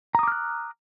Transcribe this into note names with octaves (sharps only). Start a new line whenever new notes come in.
A#5 D6 D#6 F6 F#6